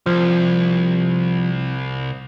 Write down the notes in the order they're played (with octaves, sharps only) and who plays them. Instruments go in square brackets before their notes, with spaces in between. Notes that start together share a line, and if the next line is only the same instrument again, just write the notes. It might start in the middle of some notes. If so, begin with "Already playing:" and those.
[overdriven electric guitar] C2 [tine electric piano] F3